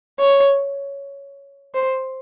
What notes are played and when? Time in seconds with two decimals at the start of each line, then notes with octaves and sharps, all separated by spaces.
0.20 C#5
1.74 C5